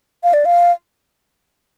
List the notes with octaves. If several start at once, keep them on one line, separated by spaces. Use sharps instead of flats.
F5
D5
F5